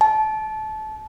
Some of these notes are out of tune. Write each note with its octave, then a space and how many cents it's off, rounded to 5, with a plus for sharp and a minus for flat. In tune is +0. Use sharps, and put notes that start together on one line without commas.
A5 -25